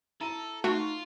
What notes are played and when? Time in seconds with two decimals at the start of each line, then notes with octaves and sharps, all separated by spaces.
0.21 E4 A4 A#5 D#7
0.64 A3 D#4 F4 F#4 C#6